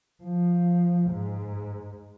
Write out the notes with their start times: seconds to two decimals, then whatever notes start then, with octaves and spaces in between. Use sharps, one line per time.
0.23 F3
1.11 G#2